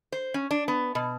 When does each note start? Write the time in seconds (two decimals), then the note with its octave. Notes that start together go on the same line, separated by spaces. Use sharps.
0.12 C5
0.34 C#4
0.51 D4
0.68 B3
0.95 B2